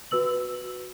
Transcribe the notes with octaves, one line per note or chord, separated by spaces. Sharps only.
F#4 B4 E6 F#7